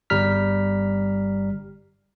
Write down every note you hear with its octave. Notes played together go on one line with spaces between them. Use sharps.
G1 G3 A#5 F6 B6